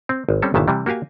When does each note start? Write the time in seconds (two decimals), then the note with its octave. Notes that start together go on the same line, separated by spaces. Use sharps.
0.09 C4
0.29 G#1
0.42 G3 C4 C#4 A4
0.54 G1 A#2 D#3 E3 E5 A5
0.68 C3 E3 G3
0.86 A#3 F#4 G4 F5 G#5